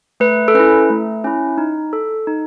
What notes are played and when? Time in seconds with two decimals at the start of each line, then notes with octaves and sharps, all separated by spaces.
0.20 A3 B4
0.48 A4
0.54 C#4 E4 B4
0.90 A3
1.24 C#4 E4
1.58 D#4
1.93 A4
2.27 D#4